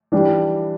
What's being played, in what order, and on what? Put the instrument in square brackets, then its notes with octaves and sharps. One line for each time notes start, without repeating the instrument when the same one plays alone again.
[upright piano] E3 G3 D4 G4